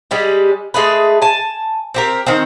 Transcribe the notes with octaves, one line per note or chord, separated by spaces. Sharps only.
G3 G#3 G4
G#3 A3 G#4 B4
G#5 A5
C4 G4 A#4
D#3 C4